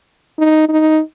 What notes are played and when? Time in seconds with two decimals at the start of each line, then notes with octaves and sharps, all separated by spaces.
0.38 D#4
0.69 D#4